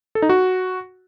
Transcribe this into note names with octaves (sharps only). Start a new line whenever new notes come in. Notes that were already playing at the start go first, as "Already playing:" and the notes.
A4
D#4
F#4